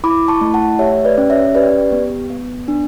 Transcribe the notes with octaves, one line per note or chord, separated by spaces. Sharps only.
E4 B5 D6
A5 C#6
A3
F#5 A5
G4 C#5 E5
B4 D5
C#4
C#5 E5
G4 B4 D5
B3
B3
D4